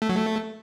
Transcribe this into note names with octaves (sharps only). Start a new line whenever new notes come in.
A3
F#3
A3